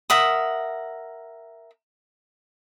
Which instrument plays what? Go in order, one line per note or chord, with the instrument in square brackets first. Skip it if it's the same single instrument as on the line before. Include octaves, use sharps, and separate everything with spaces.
[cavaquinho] A#4 E5 F#5 D#6